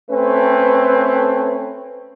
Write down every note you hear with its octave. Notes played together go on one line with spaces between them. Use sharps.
A3 C4 C#4 A4 B4